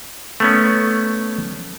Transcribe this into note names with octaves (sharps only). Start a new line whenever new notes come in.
A3 B3 C#4